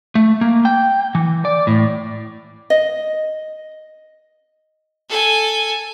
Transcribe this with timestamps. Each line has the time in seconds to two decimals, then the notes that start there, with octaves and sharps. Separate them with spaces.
0.15 A3
0.41 A#3
0.65 G5
1.15 E3
1.45 D5
1.67 A2
2.70 D#5
5.09 A4 G#5